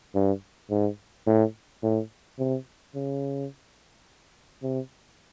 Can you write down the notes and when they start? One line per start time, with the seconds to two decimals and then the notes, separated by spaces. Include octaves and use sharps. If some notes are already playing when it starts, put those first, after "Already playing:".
0.15 G2
0.70 G#2
1.27 A2
1.83 A2
2.39 C3
2.95 C#3
4.62 C3